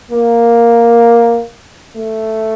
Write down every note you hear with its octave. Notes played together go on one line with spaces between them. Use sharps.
A#3
A3